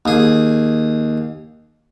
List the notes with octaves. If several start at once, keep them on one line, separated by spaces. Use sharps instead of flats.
D#2 G#4